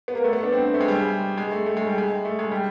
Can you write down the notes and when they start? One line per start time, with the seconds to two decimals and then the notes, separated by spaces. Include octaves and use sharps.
0.08 B3
0.15 A#3
0.24 A3
0.33 B3
0.43 D4
0.52 C4
0.74 A3
0.81 G#3
0.88 G3
0.95 G#3
1.37 G#3
1.51 A3
1.66 A3
1.77 G#3
1.87 G3
1.98 G#3
2.25 A3
2.39 G#3
2.52 G3